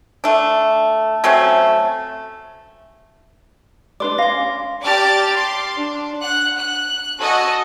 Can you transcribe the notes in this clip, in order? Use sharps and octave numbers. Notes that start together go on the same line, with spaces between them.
A3 D4
F#3 A3 C4 C#4
D4 B4 D5 C6 D6
C#4 F5 G#5 C6 A#6
G4 D5 A5 D6 F6 A6
C6 D6
D4
F#5 F#6
F#6
F#4 A4 D#5 G#5